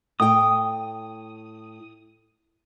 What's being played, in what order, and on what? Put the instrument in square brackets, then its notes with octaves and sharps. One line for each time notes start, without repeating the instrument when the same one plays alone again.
[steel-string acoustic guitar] A2 G5 [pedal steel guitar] D#6